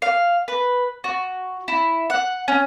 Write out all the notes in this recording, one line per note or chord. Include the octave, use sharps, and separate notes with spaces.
F5
B4
F#4
E4
F#5
C#4